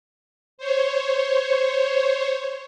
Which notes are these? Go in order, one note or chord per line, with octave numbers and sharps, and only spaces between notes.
C5 C#5